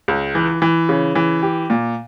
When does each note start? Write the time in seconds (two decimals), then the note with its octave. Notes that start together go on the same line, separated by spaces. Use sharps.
0.08 C#2
0.35 E3
0.62 E3
0.89 C#3
1.15 E3
1.42 G4
1.70 A#2